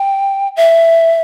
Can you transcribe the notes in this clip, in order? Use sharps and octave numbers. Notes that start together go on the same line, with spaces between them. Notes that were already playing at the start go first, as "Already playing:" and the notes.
Already playing: G5
E5